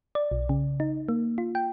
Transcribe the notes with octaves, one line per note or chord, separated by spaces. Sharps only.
D5
B1
C#3
D#4
A#3
F4
G5